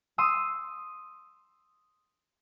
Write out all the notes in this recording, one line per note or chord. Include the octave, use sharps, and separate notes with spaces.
C6 D#6 E6